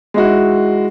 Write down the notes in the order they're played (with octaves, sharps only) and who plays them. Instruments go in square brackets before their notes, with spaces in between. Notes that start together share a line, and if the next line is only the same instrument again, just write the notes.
[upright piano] G#3 D#4 E4 F#4